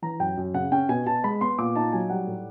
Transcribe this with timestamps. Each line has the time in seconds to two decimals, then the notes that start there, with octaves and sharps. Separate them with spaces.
0.02 E3 A#5
0.20 F#2 G5
0.37 F#2
0.54 C#3 F#5
0.72 C#4 G5
0.89 B2 G#5
1.07 B2 A5
1.24 G#3 B5
1.41 B3 C6
1.58 A#2 D6
1.75 D#4 A5
1.92 F#3 G#5
2.10 G3 F#5
2.27 A2